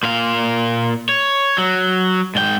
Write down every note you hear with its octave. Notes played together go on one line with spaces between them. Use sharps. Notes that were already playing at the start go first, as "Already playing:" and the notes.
A#2 F5
C#5
F#3
G#2 G5